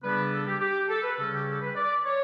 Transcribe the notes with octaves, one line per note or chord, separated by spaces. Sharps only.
C#3 G3 B3 D4 B4
A4
G4
G4
A4
B4
C#3 G3 C#4 A4
G4
A4
B4
D5
C#5